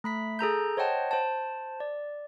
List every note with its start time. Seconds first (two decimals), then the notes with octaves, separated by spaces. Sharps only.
0.04 A3 B5 B6
0.39 G#4 A4 A#5 G6
0.77 C5 C#5 D#5 F#5 G5 A5
1.11 C5 A5
1.80 D5